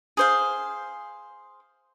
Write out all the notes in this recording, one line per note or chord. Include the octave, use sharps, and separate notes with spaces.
G#4 C5 F5